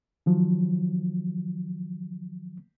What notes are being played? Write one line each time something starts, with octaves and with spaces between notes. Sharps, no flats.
D#3 F3 F#3